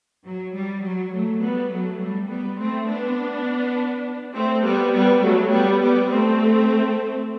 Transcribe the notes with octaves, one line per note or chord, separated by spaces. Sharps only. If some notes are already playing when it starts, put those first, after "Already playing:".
F#3
G3
F#3
F#3 A3
G3 B3
F#3 A3
G3
G3 B3
A3 C4
B3 D4
A3 C4
G3 B3
G3 B3
F#3 A3
G3 B3
G3 B3
A3 C4